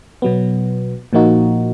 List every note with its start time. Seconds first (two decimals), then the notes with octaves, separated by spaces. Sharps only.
0.22 B2 F#3 B3
1.13 A#2 F3 A#3 D#4 F#4